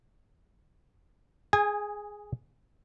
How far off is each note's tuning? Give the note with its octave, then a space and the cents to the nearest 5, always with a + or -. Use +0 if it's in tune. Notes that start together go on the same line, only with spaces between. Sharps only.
G#4 +0 G#5 -25